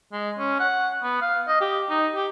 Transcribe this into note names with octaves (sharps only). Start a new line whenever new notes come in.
G#3
C#4
F#5
B3
F5
D#5
G4
D#4
G4